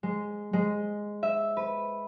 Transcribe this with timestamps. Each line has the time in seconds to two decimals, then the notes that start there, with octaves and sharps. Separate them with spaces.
0.03 G#3
0.53 G#3
1.23 E5
1.57 B4